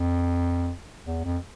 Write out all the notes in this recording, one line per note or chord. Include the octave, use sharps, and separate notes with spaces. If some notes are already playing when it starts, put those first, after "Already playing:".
Already playing: F2
E2
F2